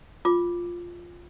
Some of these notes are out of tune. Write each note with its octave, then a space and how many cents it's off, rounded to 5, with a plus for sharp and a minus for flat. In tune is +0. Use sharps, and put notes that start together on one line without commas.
F4 +0 D6 +0